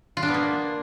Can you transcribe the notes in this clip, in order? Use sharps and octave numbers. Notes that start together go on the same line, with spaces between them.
F4
D4
B3
A#3